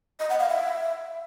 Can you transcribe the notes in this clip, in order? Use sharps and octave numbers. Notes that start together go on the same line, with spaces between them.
D#5
F#5
F5
E5